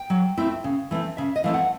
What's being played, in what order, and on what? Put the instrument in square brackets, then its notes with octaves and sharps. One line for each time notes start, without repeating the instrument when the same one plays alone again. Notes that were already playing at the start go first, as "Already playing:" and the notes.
Already playing: [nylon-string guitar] G5
F#3
A3 C4 E4
C#3
E3 A3 C4
C#3 E5
D#5
E3 A3 C4 F5
F#5